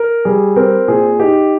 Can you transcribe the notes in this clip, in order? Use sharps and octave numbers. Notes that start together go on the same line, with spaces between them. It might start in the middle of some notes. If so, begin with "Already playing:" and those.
Already playing: A#4
G3 G#4
C4 A#4
A#2 G#4
D#4 G4